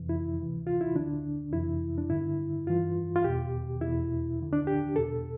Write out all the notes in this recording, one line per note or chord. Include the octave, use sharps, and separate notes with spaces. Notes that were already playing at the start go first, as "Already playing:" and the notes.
Already playing: F2 C3 E3
E4
D2 C3 E3
F4
E4
D2 D3 D4
F2 C3 E3 E4
D4
G2 D3 E4
G2 E3 F4
F4
E2 B2 G4
E2 B2 E4
D2 D3
D4
G4
E2 B2 A4